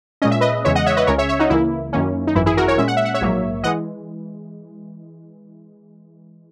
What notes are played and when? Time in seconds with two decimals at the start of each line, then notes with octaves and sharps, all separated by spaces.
0.22 A#2 G#3 C#4 D#5
0.31 E5
0.41 B4 D#5
0.65 E2 C#3 E3 G#3 C#5 E5
0.75 D#5 F#5
0.86 C#5 E5
0.97 B4 D#5
1.07 C#2 C#3 G#3 C#4 A#4 C#5
1.18 C#5 E5
1.29 C#5 E5
1.39 D#4 F#4
1.50 C#2 C#3 E3 A#3 E4
1.93 F#2 D#3 A#3 C#4
2.27 D#4
2.35 G#1 F#2 E3 E4
2.46 E4 G#4
2.57 F#4 A#4
2.68 A#4 C#5
2.78 A#2 G#3 C#4 E5
2.88 F#5
2.97 E5
3.05 F#5
3.14 C#5 E5
3.21 A#1 G#2 F#3 A#3
3.64 E3 G#3 D#5 F#5